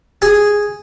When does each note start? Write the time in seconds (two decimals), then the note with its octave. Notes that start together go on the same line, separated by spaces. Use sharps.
0.22 G#4